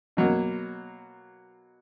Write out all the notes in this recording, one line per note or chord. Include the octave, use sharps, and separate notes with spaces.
B2 F#3 A#3